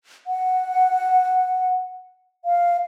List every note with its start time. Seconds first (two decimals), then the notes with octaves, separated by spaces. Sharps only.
0.27 F#5
2.45 F5